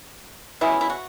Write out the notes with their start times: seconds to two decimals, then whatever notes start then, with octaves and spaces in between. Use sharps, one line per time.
0.61 B2 G#3 C#4 E4
0.81 E4
0.90 F#4